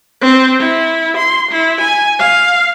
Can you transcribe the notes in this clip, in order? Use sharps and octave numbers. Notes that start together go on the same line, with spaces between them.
C4
E4
C6
E4
G#5
F5